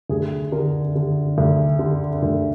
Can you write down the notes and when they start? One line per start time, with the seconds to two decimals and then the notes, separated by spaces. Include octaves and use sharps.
0.09 D2 G#4
0.52 D3 A#4
0.95 D3
1.38 D2
1.79 D3
2.23 D2